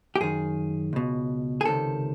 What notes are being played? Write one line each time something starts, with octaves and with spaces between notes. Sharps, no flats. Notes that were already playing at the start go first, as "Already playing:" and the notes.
G4
F#2 D#3 G#4
C#2 B2
G#4
C#2 C3 D#3 A4